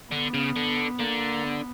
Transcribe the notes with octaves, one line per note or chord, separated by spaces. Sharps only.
D3 B3
C#3
D3
D3 A#3
B3